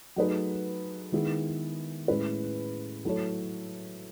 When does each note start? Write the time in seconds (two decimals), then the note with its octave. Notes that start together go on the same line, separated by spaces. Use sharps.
0.16 F#3 A3 D#4 G#4 B4
1.12 D#3 G#3 B3 E4 G#4
2.08 A2 G#3 C#4 E4 B4
3.05 F#3 A3 E4 A4 C#5